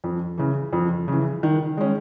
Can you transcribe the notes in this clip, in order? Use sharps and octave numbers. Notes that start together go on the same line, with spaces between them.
F2
C#3 E3
F2
C#3 E3
D#3
G#3 C#4